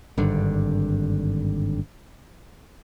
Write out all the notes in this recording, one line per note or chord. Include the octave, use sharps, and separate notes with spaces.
G#1 G2 D3 D4